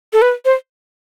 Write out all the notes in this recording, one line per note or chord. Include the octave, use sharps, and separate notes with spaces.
A4
B4
C5